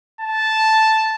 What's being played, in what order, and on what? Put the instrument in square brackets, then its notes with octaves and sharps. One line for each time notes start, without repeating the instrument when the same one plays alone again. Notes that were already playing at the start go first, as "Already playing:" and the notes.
[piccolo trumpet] A5